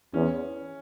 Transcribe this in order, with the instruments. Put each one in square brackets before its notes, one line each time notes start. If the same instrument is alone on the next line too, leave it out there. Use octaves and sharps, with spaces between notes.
[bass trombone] E2 [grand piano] C#4